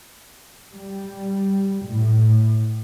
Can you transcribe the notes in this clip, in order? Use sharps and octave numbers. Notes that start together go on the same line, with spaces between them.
G3
A2